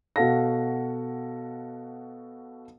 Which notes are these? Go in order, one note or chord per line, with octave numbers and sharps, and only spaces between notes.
B2 F#4 A4 F5 A#6